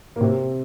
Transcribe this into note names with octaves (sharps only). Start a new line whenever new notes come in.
A#3
C3 C4